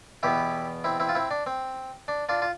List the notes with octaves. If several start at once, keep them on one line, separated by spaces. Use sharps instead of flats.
E2 B2 B3 E4 G4
C4 E4
C4 E4
F4
C4 E4
D4
C4
D4
D4 F4
F4